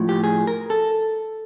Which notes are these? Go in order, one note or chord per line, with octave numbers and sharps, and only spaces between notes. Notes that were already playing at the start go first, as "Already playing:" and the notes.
Already playing: A2 F3
G4
G#4
A#4
A4